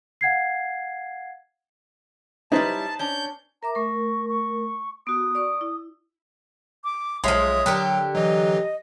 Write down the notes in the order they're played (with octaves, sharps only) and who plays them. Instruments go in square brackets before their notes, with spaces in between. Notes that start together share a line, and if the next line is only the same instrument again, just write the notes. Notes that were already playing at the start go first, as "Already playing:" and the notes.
[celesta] F5 F#5 G#6 C7
[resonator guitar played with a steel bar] G3 C#4 E4 [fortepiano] D#4 B4 C5 [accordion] A5
[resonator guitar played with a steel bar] C#4 D4 [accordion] G6
[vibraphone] A#4 E5 D6 [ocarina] A#5
[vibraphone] A3 A#4 [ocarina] C#6
[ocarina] C#6
[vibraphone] B3 F#4 [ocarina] D#6
[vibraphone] D5 C#6
E4
[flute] D6
[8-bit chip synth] B1 C#5 E5 [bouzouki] F3 G#3 [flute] D#6
[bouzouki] D3 G4 A#4 [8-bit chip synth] F#3
[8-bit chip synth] E3 F#3 [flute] D#5